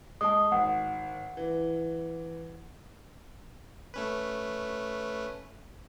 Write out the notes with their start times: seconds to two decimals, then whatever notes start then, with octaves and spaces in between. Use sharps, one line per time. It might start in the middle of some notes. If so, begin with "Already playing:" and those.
0.21 G#3 A5 D#6
0.52 G#1 F#5
1.37 E3
3.94 A3 C#4 B4